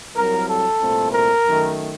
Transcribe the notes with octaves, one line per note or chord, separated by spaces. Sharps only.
C2 C3 F#3 A#4
A4
C2 A#2 A3 C4
A#4
F#2 D#3 A3